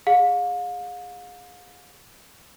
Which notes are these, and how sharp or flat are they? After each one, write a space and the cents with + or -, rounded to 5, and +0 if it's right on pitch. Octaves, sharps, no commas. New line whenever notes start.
G#4 -10 F5 +40